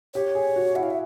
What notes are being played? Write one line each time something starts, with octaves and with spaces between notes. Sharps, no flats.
G4 C#5
G#4
F#4
E4 F#5
F5
E5